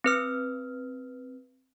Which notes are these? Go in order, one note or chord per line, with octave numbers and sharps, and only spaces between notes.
C4 B4 F6